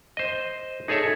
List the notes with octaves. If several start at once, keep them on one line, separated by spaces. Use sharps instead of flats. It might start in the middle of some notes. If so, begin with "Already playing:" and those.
C5 D#5
D#4 G#4 A4 C#5 E5